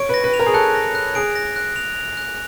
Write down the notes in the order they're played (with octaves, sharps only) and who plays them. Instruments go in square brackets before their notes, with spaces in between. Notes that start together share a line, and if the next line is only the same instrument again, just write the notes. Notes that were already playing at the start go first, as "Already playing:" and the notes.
Already playing: [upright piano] C#5 [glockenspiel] D7
[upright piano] B4 [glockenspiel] A#6
[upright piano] B4
[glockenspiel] F7
[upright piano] A#4
G#4
[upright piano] A4 [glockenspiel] F#6
[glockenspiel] A#6
F#6
[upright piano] G#4 [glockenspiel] D7
[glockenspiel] A#6
F#6
F7
F7
F#6